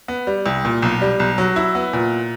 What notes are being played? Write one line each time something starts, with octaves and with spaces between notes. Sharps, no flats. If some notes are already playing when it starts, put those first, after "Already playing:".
B3
G3
C2
A#2
B1
G3
B1
F#3
E4
B3
A#2